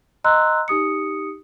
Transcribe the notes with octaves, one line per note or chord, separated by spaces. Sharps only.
D#5 A#5 C6 E6 F#6
D#4 G4 D#6 C#7